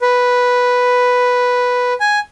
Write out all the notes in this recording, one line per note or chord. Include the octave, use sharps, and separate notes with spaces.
B4
G#5